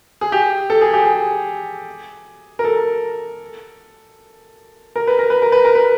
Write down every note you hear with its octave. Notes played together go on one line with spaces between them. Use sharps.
G#4
G4
A4
G#4
G4
G#4
A#4
A4
A#4
B4
A#4
B4
A#4
B4
A#4
B4